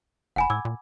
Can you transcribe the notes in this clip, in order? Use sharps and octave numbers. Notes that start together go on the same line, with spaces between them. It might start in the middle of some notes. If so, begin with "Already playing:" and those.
F#1 F#5 G#5 B5
A2 D6 E6 G#6
A#2